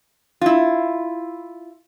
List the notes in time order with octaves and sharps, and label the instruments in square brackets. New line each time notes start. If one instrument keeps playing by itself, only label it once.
[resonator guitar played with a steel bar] E4 F4